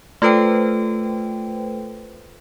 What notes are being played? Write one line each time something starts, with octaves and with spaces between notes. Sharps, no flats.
A3 F4 A4 B4 C5 G5